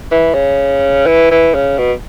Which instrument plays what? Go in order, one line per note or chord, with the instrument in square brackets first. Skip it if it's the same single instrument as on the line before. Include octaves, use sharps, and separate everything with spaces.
[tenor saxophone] E3
C#3
E3
E3
C#3
B2